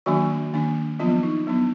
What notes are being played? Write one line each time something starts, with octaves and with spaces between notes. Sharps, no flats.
D#3 F#3 A#3 D4 F#4
D#3 A#3 D4
F3 F#3 B3 D4 F4
D#4
F#3 B3 D4